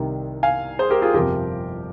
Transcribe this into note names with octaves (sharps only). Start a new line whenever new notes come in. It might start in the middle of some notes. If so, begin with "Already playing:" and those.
Already playing: C2 C3 D#3
F5 G#5
G#4 C5
G4 A#4
F4 G#4
G1 F2 C3 F3 G4 A#4